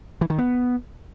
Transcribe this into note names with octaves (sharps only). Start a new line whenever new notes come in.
E3
D#3
B3